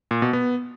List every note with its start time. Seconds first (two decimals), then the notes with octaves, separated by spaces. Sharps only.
0.11 A#2
0.22 B2
0.33 B3